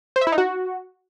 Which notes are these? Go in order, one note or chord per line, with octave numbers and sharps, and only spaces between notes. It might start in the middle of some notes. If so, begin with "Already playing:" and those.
C5
E5
E4
D#4
F#4